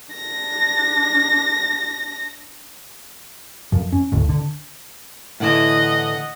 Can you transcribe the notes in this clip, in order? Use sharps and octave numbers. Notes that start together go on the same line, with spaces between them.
D4 A#6
F#2 F3
C#4
G1 D2 A2
D3
A2 D3 E3 D#5 F#5